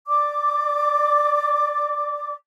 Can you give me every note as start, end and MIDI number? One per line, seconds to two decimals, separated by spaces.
0.07 2.33 74
0.07 2.33 86